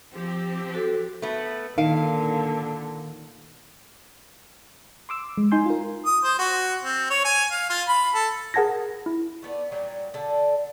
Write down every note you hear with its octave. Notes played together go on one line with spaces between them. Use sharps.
F3 C4 G4
F#4 A4
A3 B3
A#2 D3 D#3 F5
C6 D6 E6
G#3
D#4 G#5 C6 G6
F4 A#4
D#6
C5
F#4
C4
C#5
G#5
F5
F4
B5
A4
G#4 A#4 F#5 A5 G#6 A#6
E4
A3 B3 D5
A#2 F#3 G3
D3 A4